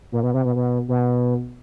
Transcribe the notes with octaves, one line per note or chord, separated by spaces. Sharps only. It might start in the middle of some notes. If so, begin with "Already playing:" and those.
A#2
B2
C3
B2
B2
B2